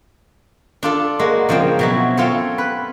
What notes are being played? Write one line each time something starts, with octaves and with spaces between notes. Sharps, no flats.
D4 F4 A4
G#3 A#3 F#4
C#3 F3 A#3 C4
B2 F#3 E4
C4 F4 A4 C#5
B4